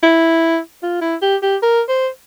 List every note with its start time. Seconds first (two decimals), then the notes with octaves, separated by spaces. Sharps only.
0.03 E4
0.83 F4
1.02 E4
1.22 G4
1.43 G4
1.63 A#4
1.89 C5